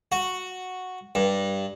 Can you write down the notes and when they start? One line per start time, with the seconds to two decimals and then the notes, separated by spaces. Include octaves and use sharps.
0.12 F#4
1.15 G2